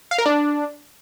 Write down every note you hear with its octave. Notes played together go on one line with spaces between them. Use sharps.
F5
A#4
D4